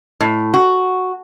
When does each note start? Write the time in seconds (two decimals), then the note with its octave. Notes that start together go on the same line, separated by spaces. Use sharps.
0.21 A2
0.54 F#4